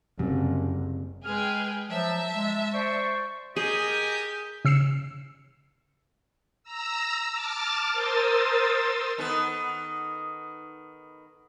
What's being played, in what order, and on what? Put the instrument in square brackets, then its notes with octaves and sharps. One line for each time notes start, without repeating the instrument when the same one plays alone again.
[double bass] F#1 [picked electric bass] F#2 [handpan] C3 G3
[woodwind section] G#3 F6 [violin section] G#4 B4 G5
[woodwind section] F3 F#3 [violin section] E5 A5
[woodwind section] G#3
C5 D5 C#6
[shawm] G4 [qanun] G#4 [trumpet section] A#4 D#5 G#5 [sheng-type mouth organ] D#6 G6
[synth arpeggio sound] C#3 E6 C7 C#7 E7
[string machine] A#5 E6
A5 D6 F6 A6
A#4 C5 C6 D#6 E6 A6
[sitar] D#3 B3 A4